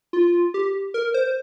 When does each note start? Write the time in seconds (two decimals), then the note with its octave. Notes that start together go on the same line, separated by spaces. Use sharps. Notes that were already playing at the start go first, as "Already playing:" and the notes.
0.13 F4
0.54 G4
0.94 A#4
1.14 C5